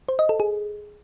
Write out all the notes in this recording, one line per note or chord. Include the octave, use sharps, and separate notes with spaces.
C5
D#5
A4
G#4